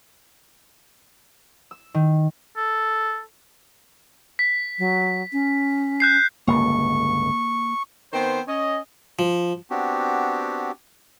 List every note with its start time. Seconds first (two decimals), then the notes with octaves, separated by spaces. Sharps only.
1.71 E6
1.94 D#3
2.57 A4
4.39 B6
4.79 F#3
5.33 C#4
6.00 F#6 G6 C7
6.48 G1 C#2 A2 A#3 C#6
8.13 D#3 B3 C4 C5
8.48 C#4 D#5
9.19 F3
9.70 B3 C4 D4 F#4 G4